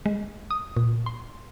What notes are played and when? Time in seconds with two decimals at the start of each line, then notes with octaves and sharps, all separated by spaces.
0.06 G#3
0.51 D#6
0.76 A#2
1.06 C6